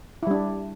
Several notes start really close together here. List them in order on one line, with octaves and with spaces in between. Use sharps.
E4 G3 D4